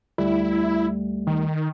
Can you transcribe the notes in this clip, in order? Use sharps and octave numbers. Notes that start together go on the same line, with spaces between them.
D2 G3 A3 E4
D#3